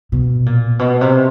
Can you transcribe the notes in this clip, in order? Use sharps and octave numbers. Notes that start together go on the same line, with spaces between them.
B2
A#2
B2
C3